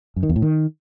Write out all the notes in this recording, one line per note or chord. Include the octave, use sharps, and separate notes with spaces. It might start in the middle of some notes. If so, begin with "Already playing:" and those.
F#2
D#3
E2
A2
D#3